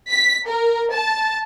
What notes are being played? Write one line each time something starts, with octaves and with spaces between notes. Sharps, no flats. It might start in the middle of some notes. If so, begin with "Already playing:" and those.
B6
A#4
A5